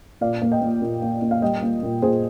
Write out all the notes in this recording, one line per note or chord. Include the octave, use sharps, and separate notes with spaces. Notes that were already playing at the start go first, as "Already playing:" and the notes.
A#2 D5 F5
A#3
D#5 G5
A#3
A#2
A#3
A#2
F5
G3 D#5 G5
A#3
A#2
A#2 G#4 C5